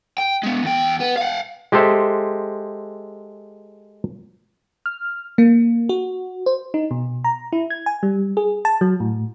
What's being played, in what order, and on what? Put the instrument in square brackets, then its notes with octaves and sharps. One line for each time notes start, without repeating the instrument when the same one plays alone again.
[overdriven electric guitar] G5
G#3 B3
E2 G5
B3
F5 F#5
[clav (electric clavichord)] G#3 G4 A4 C5 E5
[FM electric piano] F6
A#3
F#4
C5
D#4
B2
A#5
E4
G#6
G#5
G3
G#4
A5
F#3
A2